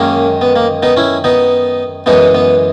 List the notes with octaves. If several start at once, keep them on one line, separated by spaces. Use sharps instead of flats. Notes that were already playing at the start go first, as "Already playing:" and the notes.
Already playing: F#2 D#3 G#3 A#3 C#4
B3
A#3
B3 D#4
C#4 E4
B3 D#4
F#2 E3 G#3 B3 D#4
B3